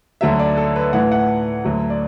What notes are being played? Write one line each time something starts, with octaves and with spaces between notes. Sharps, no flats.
D2 D3 F#3 E5
D5
A4
B4
A2 E3 F#5
F#5
D2 D3 F#3
D5